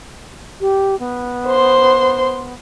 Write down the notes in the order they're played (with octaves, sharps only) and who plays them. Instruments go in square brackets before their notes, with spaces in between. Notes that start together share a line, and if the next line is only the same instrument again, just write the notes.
[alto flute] G4
B3
[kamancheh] C5 C6